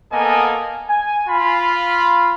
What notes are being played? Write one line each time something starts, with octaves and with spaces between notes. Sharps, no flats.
A#3 B3 A4 A#4 D#5 G#5
G#5
F4 B5